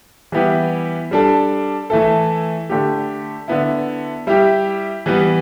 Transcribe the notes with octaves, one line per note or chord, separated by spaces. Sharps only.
E3 G3 B3 E4 G4
G3 D4 A4
E3 A3 E4 A4
D3 A3 G4
D3 B3 E4
G3 E4 G4
E3 G3 B3